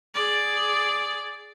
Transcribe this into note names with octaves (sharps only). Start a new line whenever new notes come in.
G#4 D5